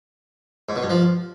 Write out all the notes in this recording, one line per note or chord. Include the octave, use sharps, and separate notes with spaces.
G#2
B2
G2
F3